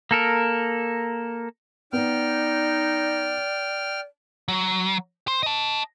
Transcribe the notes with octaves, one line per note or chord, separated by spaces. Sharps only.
A#3 A4 A#4
B3 D#4 D5 G5 F6
F#3
C5
D#5 A5